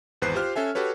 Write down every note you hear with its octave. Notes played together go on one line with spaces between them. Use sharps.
G#1 E2 B4 C5 F#6 C7
F4 G4 C5 F6
C#4 A4 E5 G#5
F#4 G4 A4 B4 C#5